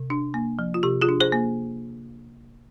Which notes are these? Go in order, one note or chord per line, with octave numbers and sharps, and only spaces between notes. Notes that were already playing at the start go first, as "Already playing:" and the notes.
Already playing: C3
D4
A#3
F3
F4
C3 G4
F4 G#4
D4
G#4 C5
A#3